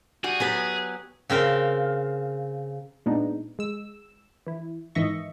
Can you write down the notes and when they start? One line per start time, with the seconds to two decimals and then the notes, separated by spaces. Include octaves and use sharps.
0.24 G3 F#4 G#4
0.40 F#3 B3 G4 B4 G#5
1.30 C#3 C4 A#4 F5
3.06 A#2 G#3 B3 D4 D#4
3.59 G#3 E6
4.47 E3 E4
4.95 G#2 D#3 E3 D#5 E5 C#6